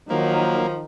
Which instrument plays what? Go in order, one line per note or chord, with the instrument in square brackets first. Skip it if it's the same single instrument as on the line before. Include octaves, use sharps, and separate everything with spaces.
[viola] D#3 [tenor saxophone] F3 [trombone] F#3 [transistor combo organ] A#3